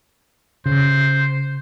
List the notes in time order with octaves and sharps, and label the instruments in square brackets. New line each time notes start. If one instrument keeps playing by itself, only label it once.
[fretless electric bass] C#3 [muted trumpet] C5